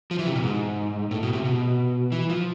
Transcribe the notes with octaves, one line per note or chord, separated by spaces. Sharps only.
F3
E3
C3
B2
G#2
A2
B2
C3
B2
E3
F3